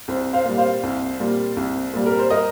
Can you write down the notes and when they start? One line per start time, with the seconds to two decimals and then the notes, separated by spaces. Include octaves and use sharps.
0.08 C2 C5
0.33 C5 F5
0.45 A#2 G3
0.58 C5 F5
0.83 C2
1.20 A#2 G3
1.57 C2
1.93 A#2 G3
2.06 A#4
2.19 C5
2.30 A#4 D#5